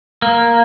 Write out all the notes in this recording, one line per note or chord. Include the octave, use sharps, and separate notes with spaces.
A#3